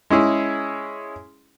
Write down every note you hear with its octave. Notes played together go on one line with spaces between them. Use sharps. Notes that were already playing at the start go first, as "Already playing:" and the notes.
G#3 C#4 E4 G#4